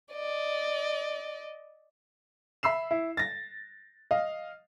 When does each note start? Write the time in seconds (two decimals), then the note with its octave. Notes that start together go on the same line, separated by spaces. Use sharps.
0.14 D5 D#5
2.63 E5 B5 E6 C7 E7
2.91 E4
3.17 A6 A#6
4.11 D#5 F5